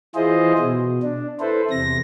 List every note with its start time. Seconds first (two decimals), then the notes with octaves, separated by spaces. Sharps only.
0.15 E3 E4 F4 G#4 C5 D#5
0.58 B2
1.02 D4
1.40 E4 A4 B4 C5
1.70 E2 C3 A#6